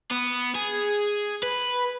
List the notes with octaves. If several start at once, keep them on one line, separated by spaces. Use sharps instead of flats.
B3
G#4
B4